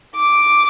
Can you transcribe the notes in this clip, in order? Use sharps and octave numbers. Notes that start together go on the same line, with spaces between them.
D6